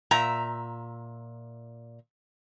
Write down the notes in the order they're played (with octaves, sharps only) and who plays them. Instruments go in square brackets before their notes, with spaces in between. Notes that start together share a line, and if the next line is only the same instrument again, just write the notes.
[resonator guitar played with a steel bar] A#2 E5 A#5